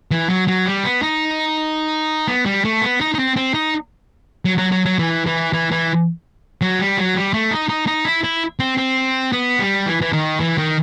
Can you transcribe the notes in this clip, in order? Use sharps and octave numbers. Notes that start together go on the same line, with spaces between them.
E3
F#3
F#3
G3
B3
D#4
B3
G3
A3
B3
D#4
D#4
C4
C4
D#4
F#3
F#3
F#3
F#3
E3
E3
E3
E3
F#3
G3
F#3
G3
A3
D#4
D#4
D#4
E4
E4
C4
C4
B3
G3
E3
E3
D#3
E3
D#3